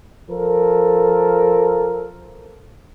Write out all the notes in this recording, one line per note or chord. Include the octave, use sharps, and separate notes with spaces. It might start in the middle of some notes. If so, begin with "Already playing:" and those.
F3 A4 A#4